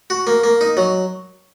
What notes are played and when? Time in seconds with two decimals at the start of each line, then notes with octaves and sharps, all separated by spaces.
0.10 F#4
0.27 A#3
0.44 A#3
0.61 D#4
0.77 F#3